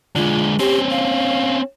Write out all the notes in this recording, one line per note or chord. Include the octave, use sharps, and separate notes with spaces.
D3 G#3 F4
C4 C#4 G4
F5